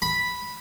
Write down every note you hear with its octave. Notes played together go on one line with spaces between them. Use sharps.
B5